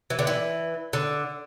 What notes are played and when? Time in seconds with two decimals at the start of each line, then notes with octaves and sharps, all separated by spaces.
0.10 E3
0.19 D3
0.27 E3
0.93 D3